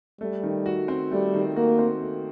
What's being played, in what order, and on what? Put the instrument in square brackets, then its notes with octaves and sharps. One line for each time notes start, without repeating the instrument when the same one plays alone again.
[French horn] G3 [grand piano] A3
[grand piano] D#3
F#4
C4
[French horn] G3 [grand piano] A3
[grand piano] D#3
[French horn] A#3 [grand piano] F#4
[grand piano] C4
A3